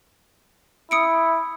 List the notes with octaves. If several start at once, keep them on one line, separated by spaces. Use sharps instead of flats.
E4 D#6 C#7 D7